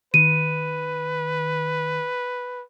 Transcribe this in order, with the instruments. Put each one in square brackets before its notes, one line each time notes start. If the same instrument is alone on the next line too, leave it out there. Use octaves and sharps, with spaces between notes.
[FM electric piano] D#3 [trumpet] B4 [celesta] D#7